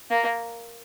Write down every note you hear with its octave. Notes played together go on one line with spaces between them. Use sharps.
A#3